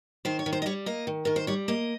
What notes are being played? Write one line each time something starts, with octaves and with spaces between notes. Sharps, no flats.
D#3 C5
C#5
D#3
C5
D#5
G3 C#5
A#3 D#5
D#3
D#3 A#4
C5
G3 C#5
A#3 D#5